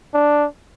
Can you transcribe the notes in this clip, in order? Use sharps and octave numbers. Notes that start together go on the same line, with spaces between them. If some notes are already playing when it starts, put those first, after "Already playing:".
D4